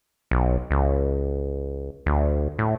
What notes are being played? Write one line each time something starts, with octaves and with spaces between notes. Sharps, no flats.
B1
C#2
D2
A2